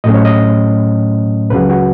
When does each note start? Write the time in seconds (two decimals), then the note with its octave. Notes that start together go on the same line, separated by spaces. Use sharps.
0.04 A2 F#3 A3 C#4 D#5
0.14 C#5
0.25 D#5
1.50 C#2 C#3 F#3 B4
1.70 F#4